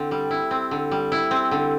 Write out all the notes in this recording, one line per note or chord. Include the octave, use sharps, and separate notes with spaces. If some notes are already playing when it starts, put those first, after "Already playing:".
Already playing: D3 C4 E4
G3
E4
C4
D3
G3
E4
C4
D3